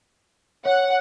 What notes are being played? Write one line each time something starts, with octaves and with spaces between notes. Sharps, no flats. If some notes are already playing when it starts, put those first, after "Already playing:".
C#5 F#5